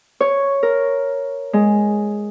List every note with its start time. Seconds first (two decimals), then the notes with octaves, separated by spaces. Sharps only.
0.20 C#5
0.63 A#4
1.53 G#3